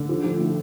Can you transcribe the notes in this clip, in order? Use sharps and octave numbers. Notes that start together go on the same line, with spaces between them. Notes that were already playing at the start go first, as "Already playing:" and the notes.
Already playing: D3
F3
F3
A2